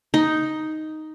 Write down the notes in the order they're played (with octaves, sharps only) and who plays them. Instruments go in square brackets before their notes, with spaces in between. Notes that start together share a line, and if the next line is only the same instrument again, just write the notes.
[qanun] D#4